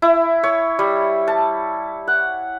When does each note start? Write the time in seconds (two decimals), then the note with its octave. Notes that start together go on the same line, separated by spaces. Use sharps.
0.02 E4
0.44 C#5
0.79 G3
1.28 A5
2.08 F#5